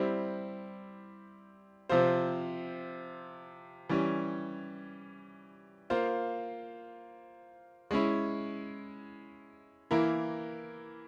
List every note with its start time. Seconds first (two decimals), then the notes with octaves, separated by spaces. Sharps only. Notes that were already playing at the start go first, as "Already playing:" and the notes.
Already playing: G3 C4 E4
1.89 C3 F3 C4 F4 C5
3.89 E3 G3 C#4
5.90 A#3 F4 C5
7.91 G#3 C#4 E4
9.91 E3 A#3 E4 A#4